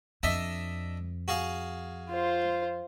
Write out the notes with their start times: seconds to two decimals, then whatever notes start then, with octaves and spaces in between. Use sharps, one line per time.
0.23 F2 D4 D#5 E5
1.28 F#4 G#4 F5
2.09 F4 C5